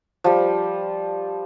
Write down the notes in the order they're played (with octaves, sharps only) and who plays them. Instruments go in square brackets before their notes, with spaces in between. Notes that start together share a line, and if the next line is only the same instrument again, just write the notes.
[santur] F3 G3